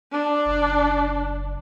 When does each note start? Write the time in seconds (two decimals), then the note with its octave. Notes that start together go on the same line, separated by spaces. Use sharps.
0.13 D4
0.46 F#1